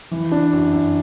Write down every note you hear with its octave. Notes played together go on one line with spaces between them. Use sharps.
E3
D4
F#2
F#2